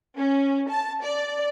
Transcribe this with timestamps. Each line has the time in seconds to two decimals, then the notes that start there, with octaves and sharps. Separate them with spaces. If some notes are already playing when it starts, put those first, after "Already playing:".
0.17 C#4
0.69 A5
1.03 D5